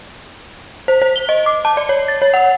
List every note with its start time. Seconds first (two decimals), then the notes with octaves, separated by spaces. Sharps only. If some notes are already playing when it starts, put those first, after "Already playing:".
0.88 C5
1.02 C5
1.16 G7
1.29 D#5
1.46 D6
1.65 A5
1.77 D5
1.89 C#5
2.08 A6
2.22 C#5
2.34 F#5